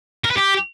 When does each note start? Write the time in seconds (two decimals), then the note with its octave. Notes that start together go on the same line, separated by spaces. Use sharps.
0.24 A#4
0.30 B4
0.36 G4